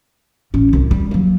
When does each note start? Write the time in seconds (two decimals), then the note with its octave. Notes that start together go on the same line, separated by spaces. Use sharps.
0.54 A1 C#4
0.73 C2 C3
0.91 G3
1.11 F#3 A#3